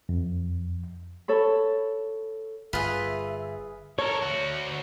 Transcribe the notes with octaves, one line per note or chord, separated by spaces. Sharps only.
F2
A4 C#5 B5
G1 F4 G#4 B4 E5
A4 A#4 C#5
D2 F#4